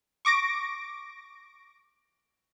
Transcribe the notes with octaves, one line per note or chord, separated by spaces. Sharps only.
C#6 D6 A#6 D7